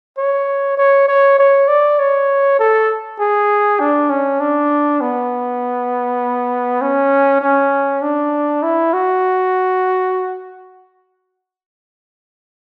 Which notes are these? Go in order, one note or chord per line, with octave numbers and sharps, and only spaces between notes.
C#5
C#5
C#5
C#5
D5
C#5
A4
G#4
D4
C#4
D4
B3
C#4
C#4
D4
E4
F#4